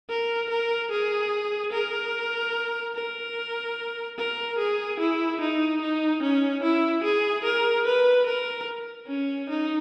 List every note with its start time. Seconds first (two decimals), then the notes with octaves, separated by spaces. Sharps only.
0.09 A#4
0.50 A#4
0.91 G#4
1.72 A#4
2.95 A#4
4.18 A#4
4.58 G#4
4.99 E4
5.40 D#4
5.82 D#4
6.22 C#4
6.63 E4
7.04 G#4
7.45 A#4
7.86 B4
8.26 A#4
9.08 C#4
9.49 D#4